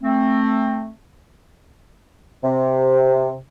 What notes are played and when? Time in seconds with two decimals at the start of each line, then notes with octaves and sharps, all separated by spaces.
0.02 A3 C4
2.43 C3